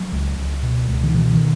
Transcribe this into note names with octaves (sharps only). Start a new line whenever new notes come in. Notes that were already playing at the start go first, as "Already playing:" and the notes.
Already playing: F#3
C#2
C#2
B2
C#2
D#3
B2 E3
D#3